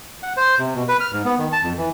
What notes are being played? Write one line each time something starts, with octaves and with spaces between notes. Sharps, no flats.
F#5
C5
C3
B2
B4
F6
G#2
B3
D#3
A5
F2
E3